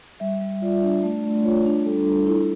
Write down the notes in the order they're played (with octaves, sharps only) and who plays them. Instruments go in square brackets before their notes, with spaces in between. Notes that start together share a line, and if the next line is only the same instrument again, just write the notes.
[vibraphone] G3 E5
G3
F4 D5
D4
A3 D5
A3
F4 C#5
D4
G3 A4
G3
E4 A4